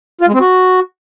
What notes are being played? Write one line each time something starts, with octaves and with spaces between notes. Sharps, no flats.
F4
G#3
C4
F#4